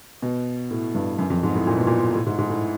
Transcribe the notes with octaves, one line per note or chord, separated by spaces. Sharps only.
B2
A2
G2
F#2
F2
G#2
A2
A#2
B2
A#2
A2
G#2
G#2
A2